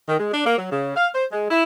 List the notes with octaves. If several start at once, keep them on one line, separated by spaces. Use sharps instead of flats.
D#3
G#3
D4
A#3
F#3
C#3
F5
C5
G#3
E4